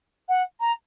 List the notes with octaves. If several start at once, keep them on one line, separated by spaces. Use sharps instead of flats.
F#5
A#5